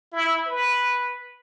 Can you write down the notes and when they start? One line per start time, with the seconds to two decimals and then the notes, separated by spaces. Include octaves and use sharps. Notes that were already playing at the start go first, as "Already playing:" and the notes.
0.12 E4
0.47 B4